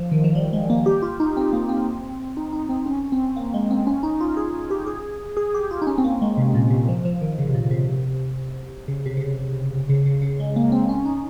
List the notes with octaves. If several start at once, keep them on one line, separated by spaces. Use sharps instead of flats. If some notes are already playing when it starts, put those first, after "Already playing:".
Already playing: F3
D#3
F3
G3
G#3
A#3
G4
F4
D#4
C4
A#3
C4
D#4
D#4
C4
C#4
C4
A#3
G#3
C4
C#4
D#4
F4
G#4
G4
G#4
G#4
G4
F4
D#4
C#4
C4
A#3
G#3
C3
A#2
C3
F3
F3
D#3
C#3
C3
A#2
C3
C#3
C3
C#3
C3
C#3
C#3
C#3
G#3
A#3
C4
C#4
D#4